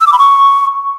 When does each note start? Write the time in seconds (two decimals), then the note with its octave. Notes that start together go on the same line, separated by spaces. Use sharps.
0.01 E6
0.07 D6
0.13 B5
0.19 C#6